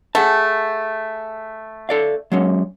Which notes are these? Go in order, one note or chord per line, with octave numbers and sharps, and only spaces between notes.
A3 G#4 F#5 A5
A4 D5 F5
F#3 G#3 C#4